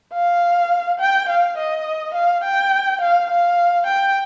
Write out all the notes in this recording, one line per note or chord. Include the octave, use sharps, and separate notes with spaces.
F5
G5
F5
D#5
F5
G5
F5
F5
G5